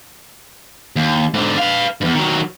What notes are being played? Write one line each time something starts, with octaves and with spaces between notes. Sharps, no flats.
D#2
G#2 D3
B4 F5
E2 G2
D#3 F#3